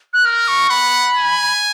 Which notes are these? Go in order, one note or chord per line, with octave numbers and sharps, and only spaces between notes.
F#6
A#4 F6
C#6
F#5 B5
G#5